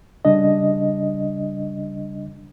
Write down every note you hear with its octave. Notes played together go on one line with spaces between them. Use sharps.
C#3 G3 D4 D#5